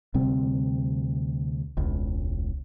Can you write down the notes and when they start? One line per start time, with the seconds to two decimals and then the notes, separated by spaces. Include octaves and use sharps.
0.14 D2 C3 G3 C4
1.77 E1 C#2